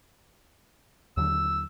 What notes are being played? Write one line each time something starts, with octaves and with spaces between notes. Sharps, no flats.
D#2 D3 F#3 E6